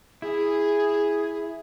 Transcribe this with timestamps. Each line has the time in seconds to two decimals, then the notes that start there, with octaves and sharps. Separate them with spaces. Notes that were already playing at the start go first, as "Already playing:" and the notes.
0.22 E4 G#4